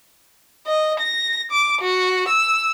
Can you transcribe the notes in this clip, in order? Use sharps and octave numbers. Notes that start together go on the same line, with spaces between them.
D#5
A#6
D6
F#4
E6